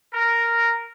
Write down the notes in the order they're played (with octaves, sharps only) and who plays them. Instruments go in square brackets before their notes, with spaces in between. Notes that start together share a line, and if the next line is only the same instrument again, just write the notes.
[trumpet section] A#4